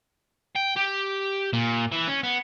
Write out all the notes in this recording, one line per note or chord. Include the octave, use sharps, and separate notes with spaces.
G5
G4
A#2
E3
C#4
B3